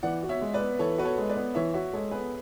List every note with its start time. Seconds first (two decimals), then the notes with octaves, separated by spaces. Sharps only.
0.03 E3 D5 F#5
0.23 F#4
0.29 C#5 E5
0.41 G#3
0.54 B4 D5
0.61 B3
0.79 E3 A4 C#5
0.98 F#4 B4
1.05 A4 C#5
1.18 G#3
1.29 B4 D5
1.36 B3
1.55 E3 C#5 E5
1.74 F#4 C#5 E5
1.93 G#3 A4 C#5
2.11 B3 G#4 B4